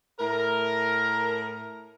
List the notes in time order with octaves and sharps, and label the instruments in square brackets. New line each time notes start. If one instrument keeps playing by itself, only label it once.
[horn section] A2 A#4